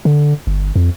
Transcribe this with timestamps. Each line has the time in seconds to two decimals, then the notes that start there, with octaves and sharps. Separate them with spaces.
0.05 D3
0.47 G1
0.76 F2